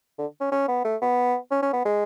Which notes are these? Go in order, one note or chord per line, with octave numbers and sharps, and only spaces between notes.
D3
C#4
C#4
B3
A3
B3
C#4
C#4
B3
G#3